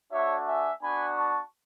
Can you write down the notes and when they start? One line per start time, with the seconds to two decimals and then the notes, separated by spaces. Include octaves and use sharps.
0.11 A3 D4 F#4 C#5 E5
0.47 E5 G#5
0.82 B3 D4 F#4 G#5 B5
1.17 A5 C#6